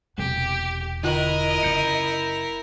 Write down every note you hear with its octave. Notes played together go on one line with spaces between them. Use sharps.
E1 C3 G4
D3 E4 F4 A#4 D#5 F#7
F#1 C#3 G6 C#7